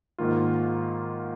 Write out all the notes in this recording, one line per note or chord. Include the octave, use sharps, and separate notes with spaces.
G#2 D#3 A#3 F4